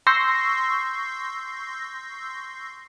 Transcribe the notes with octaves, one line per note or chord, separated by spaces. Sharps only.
C6 C#6 E6 G6 A#6 C7